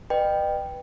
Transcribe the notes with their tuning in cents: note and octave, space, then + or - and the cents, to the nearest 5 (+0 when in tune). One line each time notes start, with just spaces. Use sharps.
B4 +0 D#5 -40 G5 +0